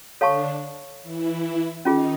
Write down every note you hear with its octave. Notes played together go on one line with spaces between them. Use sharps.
D3 D4 A4 C#5 F5 A5 C#6
E3 E4
D#3 C#4 D#4 F4 G#4